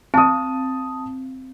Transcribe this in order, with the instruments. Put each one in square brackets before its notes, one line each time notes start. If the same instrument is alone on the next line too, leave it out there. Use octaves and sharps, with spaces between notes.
[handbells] C4 [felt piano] A5 D#6